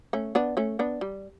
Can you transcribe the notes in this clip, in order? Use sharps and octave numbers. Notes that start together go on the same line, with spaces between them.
A3 C#4
B3 D4
A3 C#4
B3 D4
G3